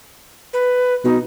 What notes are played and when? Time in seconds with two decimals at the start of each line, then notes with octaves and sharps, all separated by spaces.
0.53 B4
1.05 B2 D#4